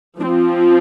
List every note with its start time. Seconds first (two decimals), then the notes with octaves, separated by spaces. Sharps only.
0.20 F3 C4 D4